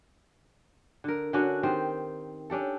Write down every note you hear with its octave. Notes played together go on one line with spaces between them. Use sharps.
D3 A#4
D3 C#4 D4 F#4
D#3 C4 G4
C#4 D4 G4 A4